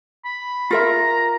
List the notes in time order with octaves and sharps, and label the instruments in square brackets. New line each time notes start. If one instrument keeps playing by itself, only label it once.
[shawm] B5
[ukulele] F4 A#4 E5 [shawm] A#5